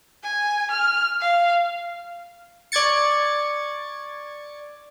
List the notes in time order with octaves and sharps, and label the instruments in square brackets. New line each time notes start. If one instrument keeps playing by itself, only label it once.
[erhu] G#5
F6
F5
[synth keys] D5 C#6 G#6 A6 C#7